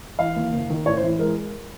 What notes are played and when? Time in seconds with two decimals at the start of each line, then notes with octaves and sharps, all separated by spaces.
0.19 E3 F5
0.36 D#2
0.52 F#1
0.70 D#3
0.86 A1 C#5
0.97 C5
1.03 E3
1.19 G#3 A#4